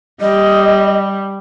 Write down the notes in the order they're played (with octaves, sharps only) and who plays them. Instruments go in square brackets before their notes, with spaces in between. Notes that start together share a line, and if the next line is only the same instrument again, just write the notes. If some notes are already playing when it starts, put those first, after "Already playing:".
[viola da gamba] G3 [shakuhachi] D#5